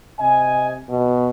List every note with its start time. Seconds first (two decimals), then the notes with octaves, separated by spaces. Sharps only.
0.20 C3 D#5 G#5
0.89 B2